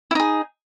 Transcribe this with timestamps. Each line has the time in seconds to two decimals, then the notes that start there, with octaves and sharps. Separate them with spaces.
0.11 E4
0.15 D#4
0.20 G#4